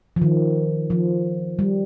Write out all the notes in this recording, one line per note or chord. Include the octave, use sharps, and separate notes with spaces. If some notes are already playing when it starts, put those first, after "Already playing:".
F3
D#3
F3
G3